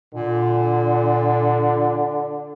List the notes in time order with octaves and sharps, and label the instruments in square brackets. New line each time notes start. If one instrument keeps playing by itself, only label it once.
[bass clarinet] A#2 [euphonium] D3